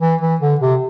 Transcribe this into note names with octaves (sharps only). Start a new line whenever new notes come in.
E3
E3
D3
C3